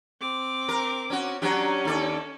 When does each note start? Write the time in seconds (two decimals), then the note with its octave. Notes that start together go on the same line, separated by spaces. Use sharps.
0.20 C4 D6
0.68 A#4
1.10 C#4 F#4
1.42 F#3 C#4 D4 G4
1.85 D#2 A4 D5